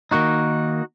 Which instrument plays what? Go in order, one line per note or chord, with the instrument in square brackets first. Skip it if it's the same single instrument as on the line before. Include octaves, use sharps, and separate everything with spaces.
[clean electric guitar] D#3 A#3 D#4 F#4